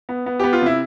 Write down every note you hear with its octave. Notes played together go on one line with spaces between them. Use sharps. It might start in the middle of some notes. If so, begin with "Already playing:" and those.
B3
B3
B3 G4
F4
C3 E4